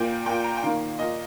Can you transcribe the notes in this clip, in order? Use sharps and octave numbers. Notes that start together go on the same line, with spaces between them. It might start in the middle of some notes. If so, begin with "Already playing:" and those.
Already playing: A#2 A#3 G5
A#2 A#3 G5
A#5
G5
D#3 A#3 F5
A#2 A#3 D#5